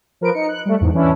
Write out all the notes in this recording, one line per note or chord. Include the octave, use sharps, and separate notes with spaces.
F3 A#4 B4 D7
D#4 C#7
F#6
G3 A3
E2 G#2
E3 C#4 D4 E4